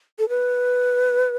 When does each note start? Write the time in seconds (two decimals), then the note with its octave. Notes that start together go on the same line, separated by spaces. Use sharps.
0.19 A4
0.29 B4